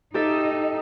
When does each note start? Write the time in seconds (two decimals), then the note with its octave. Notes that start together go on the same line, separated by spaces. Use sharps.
0.14 D#4 G4 A4 E5